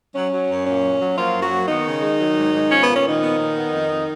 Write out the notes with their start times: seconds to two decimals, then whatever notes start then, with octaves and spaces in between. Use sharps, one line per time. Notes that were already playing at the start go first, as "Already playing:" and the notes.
0.15 F#3 C#4
0.32 F#3
0.50 F#2
0.67 A#2 C#4
0.83 F#3
1.00 F#3
1.17 F3 A#3 F4
1.34 F#2
1.42 F#3 F#4
1.52 A#3
1.68 D#3 B3 D#4
1.86 C#3
2.02 G#3
2.19 F#3
2.37 G#2
2.53 G#2
2.70 F3 C#4
2.83 B3
2.88 A#2
2.96 C#4
3.05 D#3 F3 D#4
3.21 B3
3.38 A#2
3.56 B3
3.73 F2
3.89 F2